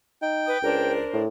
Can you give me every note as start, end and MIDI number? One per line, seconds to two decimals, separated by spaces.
0.22 0.53 63
0.22 0.92 79
0.46 0.59 71
0.46 0.59 87
0.62 1.01 37
0.62 1.22 62
0.62 1.22 70
0.62 1.22 72
1.13 1.28 45